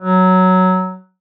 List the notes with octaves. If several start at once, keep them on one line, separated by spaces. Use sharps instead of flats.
F#3